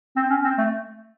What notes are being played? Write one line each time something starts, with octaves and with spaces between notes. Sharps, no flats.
C4
C#4
C4
A3